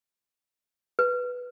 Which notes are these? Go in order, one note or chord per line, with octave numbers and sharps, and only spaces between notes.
B4